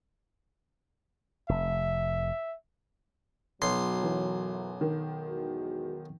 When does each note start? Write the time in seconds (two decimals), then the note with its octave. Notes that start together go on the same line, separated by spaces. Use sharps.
1.49 F1 E5
3.62 B1 F#2 F#3 C6
4.03 E3
4.81 D#3
5.28 E2 G#3 F#4